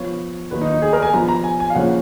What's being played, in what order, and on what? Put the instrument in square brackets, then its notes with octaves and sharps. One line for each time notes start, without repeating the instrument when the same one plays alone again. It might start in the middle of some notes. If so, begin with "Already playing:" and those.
Already playing: [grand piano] F3 B3 C#5
D#3 F#3 A#3 B4
D#4
D#4
G#4
A#4
G#5
F3 B3 A#5
A#5
G#5
G#5
F5
C#3 F3 A#3 C#4 F#5